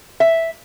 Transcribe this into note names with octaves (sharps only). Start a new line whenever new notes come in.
E5